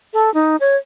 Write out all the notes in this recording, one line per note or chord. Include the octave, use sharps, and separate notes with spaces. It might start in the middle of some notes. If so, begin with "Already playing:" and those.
A4
D#4
C#5